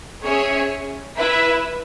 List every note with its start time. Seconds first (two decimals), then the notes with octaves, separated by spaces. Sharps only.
0.24 C#4 G#4 C#5 E5 G#5
1.17 E4 B4 E5